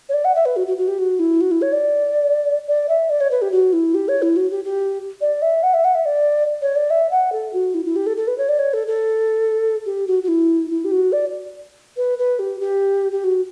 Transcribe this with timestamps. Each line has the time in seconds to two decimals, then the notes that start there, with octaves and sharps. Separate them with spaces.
0.09 C#5
0.14 D5
0.25 F#5
0.35 E5
0.46 B4
0.56 F#4
0.67 F#4
0.78 F#4
0.88 G4
0.99 F#4
1.19 E4
1.41 F#4
1.51 E4
1.62 C#5
1.73 D5
2.68 D5
2.89 E5
3.10 D5
3.21 C#5
3.31 B4
3.42 G4
3.52 F#4
3.73 E4
3.95 G4
4.08 C#5
4.22 E4
4.36 F#4
4.51 G4
4.65 G4
5.21 D5
5.42 E5
5.63 F#5
5.74 E5
5.85 F#5
5.95 E5
6.06 D5
6.62 C#5
6.76 D5
6.90 E5
7.11 F#5
7.32 A4
7.53 F#4
7.75 E4
7.85 E4
7.96 G4
8.07 A4
8.17 A4
8.28 B4
8.38 C#5
8.49 D5
8.59 C#5
8.74 A4
8.87 A4
9.86 G4
10.08 F#4
10.23 F#4
10.28 E4
10.71 E4
10.85 G4
10.92 F#4
11.12 D5
11.97 B4
12.19 B4
12.39 G4
12.60 G4
13.12 G4
13.24 F#4